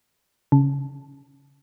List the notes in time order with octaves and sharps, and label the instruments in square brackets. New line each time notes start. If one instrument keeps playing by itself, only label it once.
[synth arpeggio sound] C#3